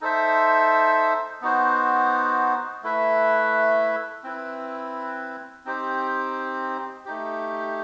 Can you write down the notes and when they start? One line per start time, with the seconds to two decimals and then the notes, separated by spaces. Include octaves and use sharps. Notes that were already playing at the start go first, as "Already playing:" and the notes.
0.01 D#4 A4 C5 E5
1.42 B3 D#4 F#4 C5
2.83 A3 E4 B4 E5
4.24 C4 E4 B4
5.65 C4 D#4 G4 C5
7.05 A3 D#4 G4